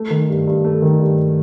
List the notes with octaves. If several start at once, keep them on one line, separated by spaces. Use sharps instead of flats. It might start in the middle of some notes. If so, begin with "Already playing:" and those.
Already playing: A3
D#3
G2
G2
A3
D#3
G2